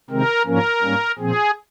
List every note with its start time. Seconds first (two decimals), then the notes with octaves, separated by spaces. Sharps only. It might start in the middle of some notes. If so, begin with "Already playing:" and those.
0.10 C3 D#3 G#3 C4 A#4
0.46 G#2 F3 A#3 C#4 A#4
0.82 G#2 G3 A#3 C#4
1.19 A#2 F3 C4 G#4